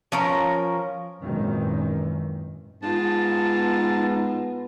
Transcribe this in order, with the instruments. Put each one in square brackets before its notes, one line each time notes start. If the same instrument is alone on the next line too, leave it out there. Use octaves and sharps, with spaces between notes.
[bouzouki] F3 C#4 A#4
[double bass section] G#1 F#2 A#2 D#3 E3
[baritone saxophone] G#2 [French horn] B3 [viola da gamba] D#4 F4 [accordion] A5